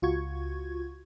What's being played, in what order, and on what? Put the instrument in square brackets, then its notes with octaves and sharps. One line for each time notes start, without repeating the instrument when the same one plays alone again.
[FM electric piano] C#2 F4 F#4 C#6 G#6